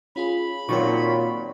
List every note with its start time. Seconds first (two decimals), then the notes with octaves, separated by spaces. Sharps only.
0.16 C#4 F4 G#4 B5
0.69 A#2 D#3 F#3 C4 C#5 C#6